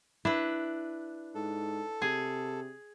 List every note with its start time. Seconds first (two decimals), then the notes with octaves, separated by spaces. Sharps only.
0.25 D4 E4 B4
1.35 G#2 A4
2.02 C3 G#4